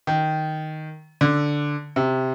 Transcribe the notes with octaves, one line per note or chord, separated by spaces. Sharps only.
D#3
D3
C3